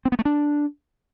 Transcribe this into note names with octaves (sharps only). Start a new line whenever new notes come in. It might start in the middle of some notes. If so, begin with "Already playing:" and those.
C4
B3
A3
D4